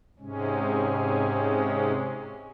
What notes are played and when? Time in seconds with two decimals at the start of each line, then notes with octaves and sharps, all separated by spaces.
0.19 G#2 C3 G#3 C#4